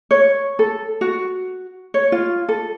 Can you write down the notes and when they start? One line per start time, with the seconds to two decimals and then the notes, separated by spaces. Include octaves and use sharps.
0.11 C#5
0.59 A4
1.01 F#4
1.94 C#5
2.12 F4
2.49 A4